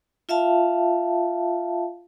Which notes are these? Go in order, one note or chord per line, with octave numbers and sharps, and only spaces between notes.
F4 E5 F5 A5